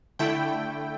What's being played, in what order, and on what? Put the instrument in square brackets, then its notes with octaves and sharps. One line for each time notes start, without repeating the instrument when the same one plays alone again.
[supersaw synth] D3 A3 E4 G5